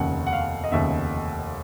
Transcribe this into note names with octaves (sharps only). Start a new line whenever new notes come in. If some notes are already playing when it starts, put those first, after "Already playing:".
Already playing: F1 D#2 C#3 F#5
F#5
F5
D#5
F1 D#2 C#3 E5